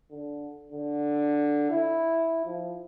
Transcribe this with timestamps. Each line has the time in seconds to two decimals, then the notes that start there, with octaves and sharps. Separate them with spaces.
0.11 D3
0.72 D3
1.70 E4
2.46 F3